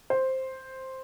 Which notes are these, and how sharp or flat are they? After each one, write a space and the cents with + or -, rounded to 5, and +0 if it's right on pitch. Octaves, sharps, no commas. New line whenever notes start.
C5 +5